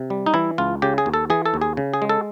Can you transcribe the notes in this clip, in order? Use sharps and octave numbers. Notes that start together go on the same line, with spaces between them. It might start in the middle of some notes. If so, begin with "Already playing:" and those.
Already playing: C3
G3
D#4
E3 E4
C#2 F4
C#3 G4
G#4
D#2
A4
E3 G#4
A4
D#2
G#4
C#3
G#4
G#3
A4